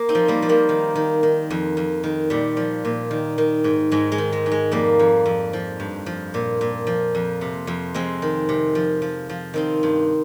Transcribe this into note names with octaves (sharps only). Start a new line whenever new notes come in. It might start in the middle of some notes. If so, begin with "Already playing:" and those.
Already playing: A#3
C4 D#4
F3
G3 A#3
F3
G3 A#3
D#3
D#3
D#3
F2
F2
D#3
A#2 G3
F3
A#2
D#3
D#3
G#2
G#2 G#3
G#3
D#3
G#3
G#2
G#3
F2 G3 A#3
F2
F2
F3
G2
F3
A#2
A#2
F3
F2
C3
F2
F2 G#3 C4
D#3
C3
F3
F3
F3
D#3 C4 D#4
G2